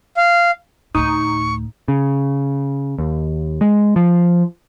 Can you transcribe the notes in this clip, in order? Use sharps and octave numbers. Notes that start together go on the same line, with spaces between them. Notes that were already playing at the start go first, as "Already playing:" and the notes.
F5
D2 A2 D#4 C#6
C#3
D#2
G#3
F3